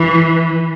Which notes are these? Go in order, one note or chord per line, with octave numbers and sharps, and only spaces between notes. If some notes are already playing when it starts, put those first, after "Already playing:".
Already playing: E3